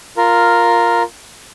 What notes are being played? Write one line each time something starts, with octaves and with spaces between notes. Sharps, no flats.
F4 A#4